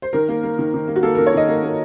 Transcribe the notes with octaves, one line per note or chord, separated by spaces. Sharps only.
C5
D#3 A#4
A#3
A#3
D#3
D#3
A#3
F#4
A#3 A4
A#4
D#3
C#5
D#3 D#5
A#3
A#3